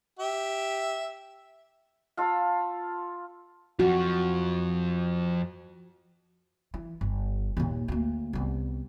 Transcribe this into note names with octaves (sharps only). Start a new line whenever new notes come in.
G4 E5
F4 A4 F5
F2 F3 F#4
E3
G1
D#2 A#2
D2 A#3
C2 B3